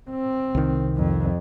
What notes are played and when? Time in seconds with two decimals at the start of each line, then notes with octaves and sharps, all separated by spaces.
0.10 C4
0.55 C2 D#3
0.97 F2